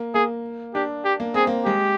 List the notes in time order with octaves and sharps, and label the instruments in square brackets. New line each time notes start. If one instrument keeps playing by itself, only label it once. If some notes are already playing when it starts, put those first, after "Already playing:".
Already playing: [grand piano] A#3
[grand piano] A#3 [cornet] G#4
[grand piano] D4 [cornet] G4
[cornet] G4
[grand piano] A#3
[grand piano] C4 [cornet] G#4
[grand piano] A#3
[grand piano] G#3 [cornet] G4